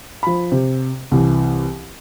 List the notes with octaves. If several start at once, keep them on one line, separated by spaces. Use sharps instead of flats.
F3 B5
C3
C2 E3